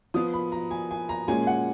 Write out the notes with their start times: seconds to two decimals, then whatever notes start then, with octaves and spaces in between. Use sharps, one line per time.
0.14 F3 B3 D#6
0.34 B5
0.52 A#5
0.71 G#5
0.91 G#5
1.09 A#5
1.28 A#2 G#3 C#4 G#5
1.47 F#5